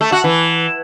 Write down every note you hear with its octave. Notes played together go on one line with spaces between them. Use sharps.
A3
F#4
E3